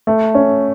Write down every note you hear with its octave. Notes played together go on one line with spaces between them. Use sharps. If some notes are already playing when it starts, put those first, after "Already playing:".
A3
C#4